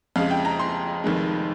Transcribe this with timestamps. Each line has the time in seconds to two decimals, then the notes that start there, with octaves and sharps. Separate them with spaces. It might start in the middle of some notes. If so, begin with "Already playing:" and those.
0.16 F2 C#3 G#3 F5
0.31 G5
0.45 A#5
0.59 C6
1.04 F1 F2 D#3 G#3